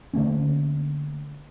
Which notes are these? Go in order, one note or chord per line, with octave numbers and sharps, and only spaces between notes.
D3 A3 A#3 C#4